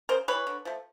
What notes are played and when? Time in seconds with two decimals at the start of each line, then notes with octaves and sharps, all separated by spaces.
0.09 C#3 A#4 C5
0.28 E3 G3 B4 C#5
0.47 D3
0.65 F3 A3